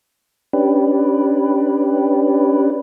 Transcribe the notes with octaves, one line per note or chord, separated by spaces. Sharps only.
C#4 D4 G4 B4